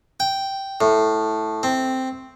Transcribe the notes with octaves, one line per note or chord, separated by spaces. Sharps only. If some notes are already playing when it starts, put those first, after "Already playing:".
G5
A2
C4